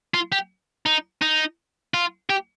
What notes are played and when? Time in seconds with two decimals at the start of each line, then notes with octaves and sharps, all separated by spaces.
0.14 F4
0.32 G4
0.86 D#4
1.22 D#4
1.94 F4
2.30 G4